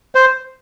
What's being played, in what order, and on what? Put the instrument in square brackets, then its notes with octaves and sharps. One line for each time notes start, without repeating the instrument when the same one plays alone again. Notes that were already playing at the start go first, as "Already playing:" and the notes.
[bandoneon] C5